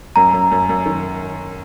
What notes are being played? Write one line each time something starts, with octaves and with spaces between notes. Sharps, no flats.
F#2 A#5
F#2
F#2
F#2
D#3